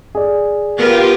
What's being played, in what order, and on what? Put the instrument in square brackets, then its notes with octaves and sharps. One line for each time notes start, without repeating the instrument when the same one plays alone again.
[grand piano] G#4 D5
[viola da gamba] B3 A#4 B4 [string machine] F4 G4